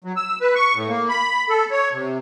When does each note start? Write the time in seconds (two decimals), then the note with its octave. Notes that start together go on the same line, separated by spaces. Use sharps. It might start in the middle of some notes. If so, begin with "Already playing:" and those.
0.04 F#3
0.16 E6
0.41 B4
0.55 C#6
0.74 A2
0.89 A#3
1.09 B5
1.49 A4
1.71 C#5
1.93 C3